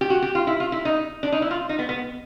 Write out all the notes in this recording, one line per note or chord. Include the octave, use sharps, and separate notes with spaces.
G4
F#4
G4
F4
E4
F4
E4
D#4
D4
D#4
E4
F4
D#4
B3
B3